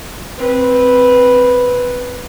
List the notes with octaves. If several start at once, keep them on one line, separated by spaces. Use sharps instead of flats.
C4 B4